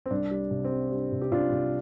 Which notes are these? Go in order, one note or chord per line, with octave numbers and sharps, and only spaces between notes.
C4
C2 D4
G3
C3
C4
G3
G3 D4
C3
G4
C3 D4 F4
C3